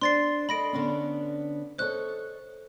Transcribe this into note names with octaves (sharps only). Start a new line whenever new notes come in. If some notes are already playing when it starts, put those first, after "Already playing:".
D4 C5 C6 A6 C7
A4 D#5 B5 A#6 D7
D3 B3 C#4
A4 C5 C#5 D#5 F#6